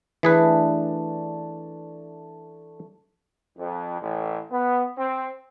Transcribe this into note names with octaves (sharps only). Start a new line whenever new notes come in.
E3 A3 D4 G#4 B4
F2
A1
B3
C4